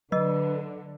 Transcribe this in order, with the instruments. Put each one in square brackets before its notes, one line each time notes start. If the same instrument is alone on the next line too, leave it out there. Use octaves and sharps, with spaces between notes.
[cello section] D3 [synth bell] F#3 [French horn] B4 [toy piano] D#5